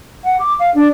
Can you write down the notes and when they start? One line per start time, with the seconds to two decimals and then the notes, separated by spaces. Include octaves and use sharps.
0.24 F#5
0.39 D6
0.59 F5
0.74 D4